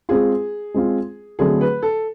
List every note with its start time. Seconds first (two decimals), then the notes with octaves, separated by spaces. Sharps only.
0.09 G#3 C4 F4 G#4
0.74 G#3 C4 F4
1.39 D3 F#3 A3 C4 G#4
1.61 B4
1.83 A4